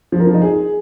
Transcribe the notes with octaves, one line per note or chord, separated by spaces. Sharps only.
F3
A#4
F3
D#4
G#4